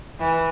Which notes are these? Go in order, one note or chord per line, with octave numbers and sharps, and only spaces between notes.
E3